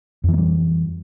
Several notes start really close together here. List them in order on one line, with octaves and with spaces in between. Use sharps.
F2 E3 A#3 G3